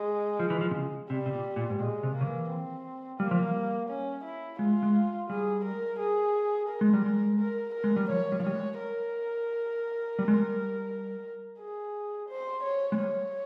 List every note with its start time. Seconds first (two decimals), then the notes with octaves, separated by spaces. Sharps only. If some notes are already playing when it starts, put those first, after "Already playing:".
Already playing: G#3
0.39 F3
0.50 E3
0.61 F3
0.71 C3
0.75 C#3
1.10 C3 G3
1.26 C3
1.33 A#2
1.56 A#2
1.70 G#2
1.80 A#2 G#3
2.03 C3
2.15 A#3
2.21 C#3
2.27 E3
2.49 C4
3.20 G3 A#3
3.31 F3
3.43 G3
3.89 C#4
4.24 E4
4.59 G#3 F4
4.83 G#3
5.30 G3 G#4
5.65 A#4
5.99 G#4
6.69 A#4
6.81 G#3
6.93 G3
7.06 G#3
7.39 A#4
7.74 A#4
7.84 G#3
7.96 G3
8.09 F3 C#5
8.32 G3
8.40 F3
8.44 G3 C#5
8.56 G#3
8.79 A#4
10.19 G3
10.28 G#3
10.37 G3
11.59 G#4
12.29 C5
12.63 C#5
12.92 G#3
12.98 G3 C#5